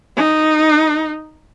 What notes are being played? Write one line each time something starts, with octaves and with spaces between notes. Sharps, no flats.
D#4